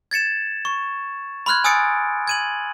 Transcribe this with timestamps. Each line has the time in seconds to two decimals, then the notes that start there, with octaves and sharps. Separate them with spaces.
0.11 G#6 A6 C#7 E7
0.65 C#6
1.46 B5 C6 F6 F#6 G#6
1.64 G#5 D#6 E6 A6 C#7 D7
2.27 G#6 D#7 F#7